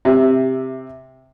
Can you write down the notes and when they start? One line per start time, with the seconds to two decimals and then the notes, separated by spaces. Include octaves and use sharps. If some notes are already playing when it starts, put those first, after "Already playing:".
0.05 C3 E5